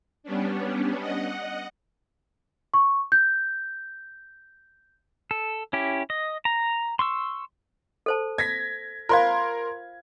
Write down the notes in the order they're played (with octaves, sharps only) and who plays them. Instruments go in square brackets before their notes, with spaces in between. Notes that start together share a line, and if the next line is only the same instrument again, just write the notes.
[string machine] G3 B3 C#4 D4
D#5 F#5
[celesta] C#6
G6
[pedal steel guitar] A4
C#4 E4 G4
D#5
A#5
C6 C#6 E6
[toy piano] A4 C5 A5
[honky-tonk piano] G#6 A#6 B6
[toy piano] F4 C5 F5 [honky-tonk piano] A#4 C6 G#6